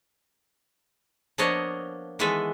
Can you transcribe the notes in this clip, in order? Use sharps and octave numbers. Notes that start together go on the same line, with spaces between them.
F3 A#3 B3 D4 C#5 D#5
D#3 E3 G#3 B3 A4 E5